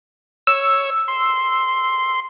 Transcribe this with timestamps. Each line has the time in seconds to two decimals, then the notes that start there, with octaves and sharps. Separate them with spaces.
0.47 C#5 E6
1.08 C6